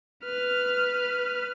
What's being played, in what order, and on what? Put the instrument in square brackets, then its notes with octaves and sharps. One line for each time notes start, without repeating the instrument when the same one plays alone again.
[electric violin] B4 F6